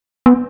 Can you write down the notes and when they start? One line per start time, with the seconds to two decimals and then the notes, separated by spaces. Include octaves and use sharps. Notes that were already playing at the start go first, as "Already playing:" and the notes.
0.26 B3